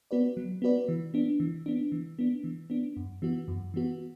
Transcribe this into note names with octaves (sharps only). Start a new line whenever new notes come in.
B3 F#4 B4 D5
F#3
B3 F#4 B4 D5
E3
B3 D4
E3
B3 D4
E3
B3 D4
E3
B3 D4
F#2
E3 B3 F#4
F#2
E3 B3 F#4